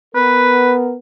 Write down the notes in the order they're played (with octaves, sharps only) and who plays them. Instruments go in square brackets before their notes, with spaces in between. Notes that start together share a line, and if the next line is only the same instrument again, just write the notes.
[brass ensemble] B3 A#4 [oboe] B4